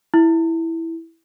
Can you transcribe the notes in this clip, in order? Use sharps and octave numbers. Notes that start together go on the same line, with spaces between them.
E4